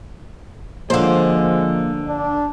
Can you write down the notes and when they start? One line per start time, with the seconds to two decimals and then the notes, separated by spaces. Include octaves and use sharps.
0.90 D3 F3 G#3 A#3 C5 F5
2.08 D4